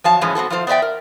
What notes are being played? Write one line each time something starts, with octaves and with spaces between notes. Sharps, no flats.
F3 F#3 F5 A5
A2 E3 F3 G#3 C#4
B3 C4 F#4 A4
F3 A3 F4 C5
B3 C5 D5 E5 G5
A#4